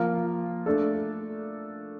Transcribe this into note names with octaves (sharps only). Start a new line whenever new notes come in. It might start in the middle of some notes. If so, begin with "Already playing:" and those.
Already playing: F3 A#3 F4 A#4
A3 D4 A4